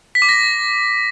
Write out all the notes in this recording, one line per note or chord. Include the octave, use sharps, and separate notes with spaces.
B6
D6
A#6